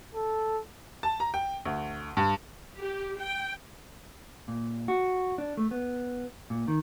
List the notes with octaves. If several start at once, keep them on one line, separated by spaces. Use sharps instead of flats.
A4
A5
A#5
G5
D2
G2
G4
G5
A#2
F#4
D4
A3
B3
A#2
D#3